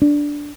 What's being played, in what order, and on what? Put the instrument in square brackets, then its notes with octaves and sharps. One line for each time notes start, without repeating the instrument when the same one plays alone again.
[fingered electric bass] D4